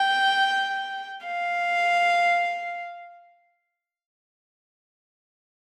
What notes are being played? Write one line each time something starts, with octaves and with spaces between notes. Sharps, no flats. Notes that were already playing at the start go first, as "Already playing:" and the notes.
Already playing: G5
F5